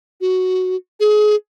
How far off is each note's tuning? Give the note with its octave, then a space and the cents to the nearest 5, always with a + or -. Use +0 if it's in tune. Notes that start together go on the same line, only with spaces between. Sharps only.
F#4 +0
G#4 +30